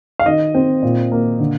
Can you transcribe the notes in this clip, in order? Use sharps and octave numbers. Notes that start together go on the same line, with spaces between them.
F5
D#3 D#5
C4
A#2
A#3
D3